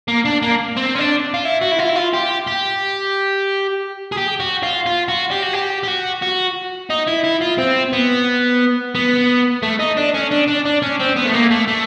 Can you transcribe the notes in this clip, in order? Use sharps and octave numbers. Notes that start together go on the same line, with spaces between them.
A#3
D4
A#3
C4
C#4
D4
F4
E4
F#4
E4
F4
E4
F4
G4
G4
G#4
G4
F#4
F4
F4
F#4
G4
F#4
G4
G4
F#4
F#4
D#4
E4
E4
F4
C4
B3
B3
A3
D#4
D4
C#4
D4
D4
D4
C#4
C4
B3
A3
A#3
A3
A3